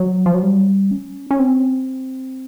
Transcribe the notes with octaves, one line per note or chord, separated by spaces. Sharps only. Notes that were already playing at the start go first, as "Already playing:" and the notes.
Already playing: F#3
F3
F#3
G3
C#4
C#4
C4